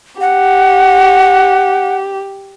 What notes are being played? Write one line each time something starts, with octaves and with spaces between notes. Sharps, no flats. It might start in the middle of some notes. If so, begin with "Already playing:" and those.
G4 F#5